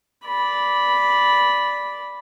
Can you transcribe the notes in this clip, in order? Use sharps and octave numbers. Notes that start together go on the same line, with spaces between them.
D5 B5